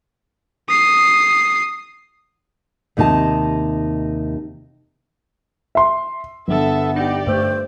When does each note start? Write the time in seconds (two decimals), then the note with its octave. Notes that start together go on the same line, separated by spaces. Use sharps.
0.69 D#6 C7
2.97 D#2 C3 D#4 D#5 A5
5.75 E5 C6
6.48 G1 B3 A4 E5
6.96 D#4 G4 D5
7.27 G2 A3 C5